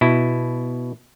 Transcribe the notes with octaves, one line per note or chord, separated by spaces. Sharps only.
B2 E4